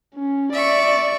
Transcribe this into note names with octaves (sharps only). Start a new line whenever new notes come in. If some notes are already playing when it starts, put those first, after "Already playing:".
C#4
D5 E5 C#6